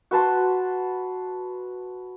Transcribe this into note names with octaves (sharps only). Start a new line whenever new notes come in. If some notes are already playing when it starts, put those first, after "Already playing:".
F#4 B4 A5 C6